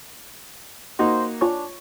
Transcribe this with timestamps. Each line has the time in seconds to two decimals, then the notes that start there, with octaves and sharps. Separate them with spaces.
0.99 A#3 D#4 F#4 C5
1.41 D4 F4 C#5 G#5 C#6